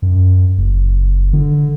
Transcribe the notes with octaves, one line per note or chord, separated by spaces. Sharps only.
F#2
F#1
D3